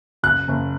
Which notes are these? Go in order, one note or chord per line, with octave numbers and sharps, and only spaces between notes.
F#1 F#6
F#1